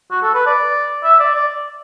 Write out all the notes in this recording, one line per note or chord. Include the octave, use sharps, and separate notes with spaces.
F#4
A4
B4
D5
E5
D5
D5